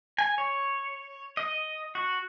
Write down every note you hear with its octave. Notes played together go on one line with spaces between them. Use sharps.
G#5
C#5
D#5
F#4